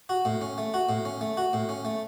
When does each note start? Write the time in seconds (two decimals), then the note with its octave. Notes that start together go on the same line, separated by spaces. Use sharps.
0.09 F#4
0.25 A2
0.41 C#4
0.58 A3
0.74 F#4
0.89 A2
1.05 C#4
1.21 A3
1.37 F#4
1.53 A2
1.69 C#4
1.85 A3